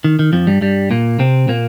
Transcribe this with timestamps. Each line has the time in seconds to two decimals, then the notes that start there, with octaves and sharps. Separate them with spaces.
0.04 D#3
0.19 D#3
0.33 F2 F3
0.47 G2 G3
0.61 G2 G3
0.91 A#2 A#3
1.19 C3 C4
1.48 A#2 A#3